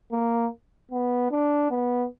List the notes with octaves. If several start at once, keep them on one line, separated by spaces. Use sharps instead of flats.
A#3
B3
D4
B3